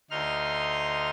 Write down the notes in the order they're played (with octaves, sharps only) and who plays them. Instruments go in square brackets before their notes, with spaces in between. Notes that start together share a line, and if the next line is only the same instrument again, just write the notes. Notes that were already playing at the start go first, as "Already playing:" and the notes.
[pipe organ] D2 D#4 C6 F6